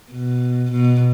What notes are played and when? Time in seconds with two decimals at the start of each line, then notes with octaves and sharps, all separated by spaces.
0.11 B2
0.73 B2